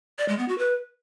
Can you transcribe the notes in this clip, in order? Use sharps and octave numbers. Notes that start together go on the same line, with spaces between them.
D5
G#3
B3
F#4
B4